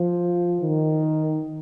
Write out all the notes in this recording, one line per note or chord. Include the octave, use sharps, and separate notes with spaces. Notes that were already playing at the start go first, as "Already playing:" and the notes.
Already playing: F3
D#3